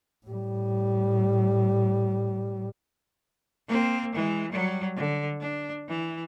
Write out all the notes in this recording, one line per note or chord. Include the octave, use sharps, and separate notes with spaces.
A2 G3
A#3 C4
E3 G#3
F#3 G3
D3
D4
E3